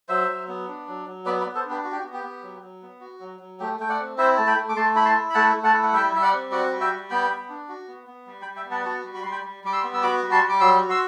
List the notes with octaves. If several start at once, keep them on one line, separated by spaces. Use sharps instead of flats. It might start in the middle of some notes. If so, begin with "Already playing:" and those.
F#3 C5 E5
F#3
B3
D4
F#3
F#3
B3 B4 D5
B4 D5
B3
A4 C5
D4
G4 B4
F#4
G4
F#4
B3
G4
B3
F#3
F#3
B3
F#4
F#3
F#3
A3 G4
A3 G5
D5 F#5
C4
E4 C5 E5
A3 A5
G5 B5
A3
D6
A3 A5 C6
E4 B5
A5 C6
E4
B5
A3 F#5 A5
A3
F#5 A5
E4
F#5
G3 E5 G5
G3 E5
D5 F#5
C4
F#4 D5 F#5
G3
E5 G5
G3
B3 G5 B5
B3
D4
F#4
B3
B3
G3
G5 B5
G3
E5 G5
B3
F#5 A5
F#4 F#5 A5
G3
B5
G3 C6
G5 B5
G3
G3 D6
C6 E6
B3
E6
F#4 B5 D6
G3
A5 C6
G3
D6
F#3 C6 E6
F#4
C6 E6